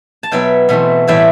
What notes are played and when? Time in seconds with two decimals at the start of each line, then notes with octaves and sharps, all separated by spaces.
0.23 A5
0.32 B2 F#3 B3 E5 G5
0.69 E2 B2 A3 C4
1.08 A2 E3 G3 E5 G5